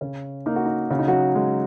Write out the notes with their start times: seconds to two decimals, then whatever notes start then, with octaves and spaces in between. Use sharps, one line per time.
0.01 C#3 C#4
0.46 A#3 D#4
0.56 F#4
0.65 D#4
0.91 C#3 F#4
0.99 D#4
1.07 F#3 F#4
1.35 G#3